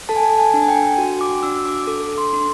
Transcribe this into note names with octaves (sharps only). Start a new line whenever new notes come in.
A4 A5
G#5
A5
G#5
D4
G#5
G5
F#4
D6
D4 E6
D6
A4 D6
C6
D4